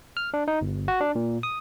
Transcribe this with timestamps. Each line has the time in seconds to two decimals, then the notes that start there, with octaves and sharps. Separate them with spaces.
0.17 F6
0.34 D4
0.48 D#4
0.61 G1
0.88 F#4
1.01 D4
1.15 A#2
1.43 D#6